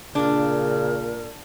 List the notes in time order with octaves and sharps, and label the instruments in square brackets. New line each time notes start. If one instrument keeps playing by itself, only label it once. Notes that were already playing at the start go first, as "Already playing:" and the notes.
[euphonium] A#2 [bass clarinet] C#3 [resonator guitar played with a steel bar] D4 [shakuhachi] A#4